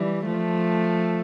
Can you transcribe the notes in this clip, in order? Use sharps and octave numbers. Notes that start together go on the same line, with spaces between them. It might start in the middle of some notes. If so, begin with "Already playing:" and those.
Already playing: E3 G3
F3 A3